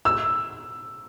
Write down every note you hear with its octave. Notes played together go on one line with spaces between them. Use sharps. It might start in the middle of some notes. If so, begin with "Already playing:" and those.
E6